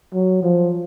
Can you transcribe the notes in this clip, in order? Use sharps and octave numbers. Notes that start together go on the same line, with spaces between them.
F#3
F3